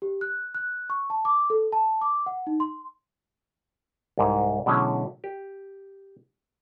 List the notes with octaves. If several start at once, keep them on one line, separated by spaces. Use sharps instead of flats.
G4
F#6
F#6
C#6
A5
D6
A4
A5
D6
F#5
D#4
C6
C2 G#2
B2 D3 F#3 G#3 C#4 E4
G4